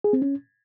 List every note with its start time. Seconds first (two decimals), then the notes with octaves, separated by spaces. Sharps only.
0.04 G#4
0.13 C4
0.22 C#4